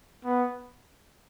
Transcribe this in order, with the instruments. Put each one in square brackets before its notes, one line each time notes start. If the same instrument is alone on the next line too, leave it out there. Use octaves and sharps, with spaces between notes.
[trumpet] B3